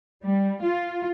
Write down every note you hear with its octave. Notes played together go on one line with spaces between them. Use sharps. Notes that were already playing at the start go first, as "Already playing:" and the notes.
G3
F4